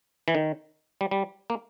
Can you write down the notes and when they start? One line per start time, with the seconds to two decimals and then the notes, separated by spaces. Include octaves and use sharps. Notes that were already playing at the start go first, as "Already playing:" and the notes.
0.28 E3
0.35 D#3
1.01 G3
1.11 G3
1.50 A#3